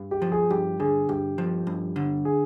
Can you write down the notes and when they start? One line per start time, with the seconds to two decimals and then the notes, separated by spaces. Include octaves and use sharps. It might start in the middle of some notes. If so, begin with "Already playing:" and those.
Already playing: G2
0.11 G4
0.22 F3
0.32 G#4
0.50 G2 G4
0.80 D3 G#4
1.09 G2 G4
1.38 F3
1.67 G2
1.96 D3
2.25 G#4